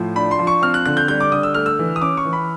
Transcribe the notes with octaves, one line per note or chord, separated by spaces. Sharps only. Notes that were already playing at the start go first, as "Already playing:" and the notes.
Already playing: A2 F3
D4 B5
C6
F3
C#6
C4 F6
F#6
D3 F#6
G6
G3 G6
D6
D3 D#6
E6
A3 F6
E6
E3
D#6
C#4 D6
C#6
E3
B5